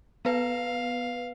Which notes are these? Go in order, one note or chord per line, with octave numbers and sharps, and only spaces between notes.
B3 B4 F5